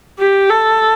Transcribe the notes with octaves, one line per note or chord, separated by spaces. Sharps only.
G4
A4